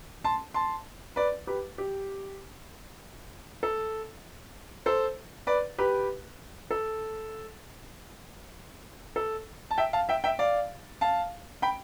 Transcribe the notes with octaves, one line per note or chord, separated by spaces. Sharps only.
A5 C6
A5 C6
B4 D5
G4 B4
G4
A4
A4 C5
B4 D5
G4 B4
A4
A4
A5
E5 G5
F5 A5
E5 G5
E5 G5
D5 F5
F5 A5
G5 B5